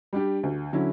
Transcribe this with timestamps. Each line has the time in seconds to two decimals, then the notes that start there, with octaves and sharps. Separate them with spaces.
0.13 G3 D4 G4
0.43 D2
0.73 D3 F#3 C#4 E4